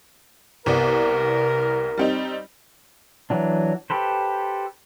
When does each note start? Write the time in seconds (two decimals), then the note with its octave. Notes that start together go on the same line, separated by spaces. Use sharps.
0.66 C2 B3 A#4 D5
1.97 G3 C4 D#4
3.30 E3 F#3 D4
3.90 G4 A4 B4 C5